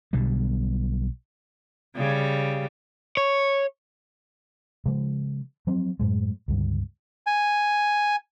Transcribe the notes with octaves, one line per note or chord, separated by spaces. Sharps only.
B1 B2 D3 G3
C#3 G3
C#5
C#3 F3 G#3
F3 F#3 C4
F#2 A2 G#3
C#2 G2 D3
G#5